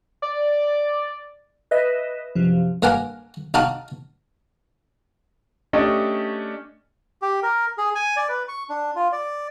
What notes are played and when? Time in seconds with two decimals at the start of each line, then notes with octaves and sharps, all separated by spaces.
0.22 D5
1.71 B4 D#5 E5
2.35 F#2 C3 F3
2.82 G2 A#3 A#4 F#5 G#5 D6
3.54 D#4 F#4 F5 A5 D6 D#6
5.73 A3 C#4 D4 G4 D#5
7.22 G4
7.43 A#4
7.78 G#4
7.95 G#5
8.17 D5
8.29 B4
8.48 C#6
8.69 D4
8.95 F4
9.12 D5